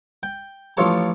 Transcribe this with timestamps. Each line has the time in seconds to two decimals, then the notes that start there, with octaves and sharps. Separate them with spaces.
0.23 G5
0.77 A1 F3 F4 A4 C#5 A5